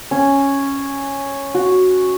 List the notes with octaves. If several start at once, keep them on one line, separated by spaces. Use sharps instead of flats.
C#4
F#4